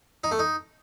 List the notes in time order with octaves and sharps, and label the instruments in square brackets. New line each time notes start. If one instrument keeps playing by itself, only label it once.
[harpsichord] D#4
A3
D#4